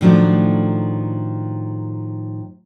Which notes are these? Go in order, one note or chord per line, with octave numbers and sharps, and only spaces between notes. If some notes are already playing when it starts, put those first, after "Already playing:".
A2 D#3 F3 F#3 A3 D4